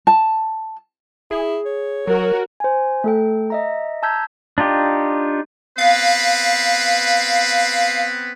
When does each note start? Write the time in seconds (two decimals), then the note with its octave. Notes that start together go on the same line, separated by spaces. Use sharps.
0.07 A5
1.31 E4 G#4
1.66 C#5
2.07 F#3 F#4 A#4
2.60 C5 G#5
3.04 A3 A4 G5
3.50 D#5 E5 A#5
4.03 A5 A#5 E6 G6 G#6 B6
4.58 D4 D#4 F4 G4
5.78 B3 C4 B4 F5